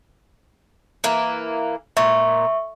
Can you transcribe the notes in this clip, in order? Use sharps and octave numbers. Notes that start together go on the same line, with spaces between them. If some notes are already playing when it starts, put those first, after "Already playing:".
E3 A#3
A#2 E5 C#6